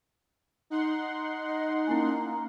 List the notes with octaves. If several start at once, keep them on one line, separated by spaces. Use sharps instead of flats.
D#4 F#5 C6
D#5
A#3 C#4 E4 G#5